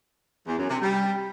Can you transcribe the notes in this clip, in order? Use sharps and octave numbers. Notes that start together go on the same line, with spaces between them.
E2
F#2
C3
G3